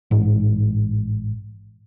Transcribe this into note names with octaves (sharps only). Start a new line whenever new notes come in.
A1 G#2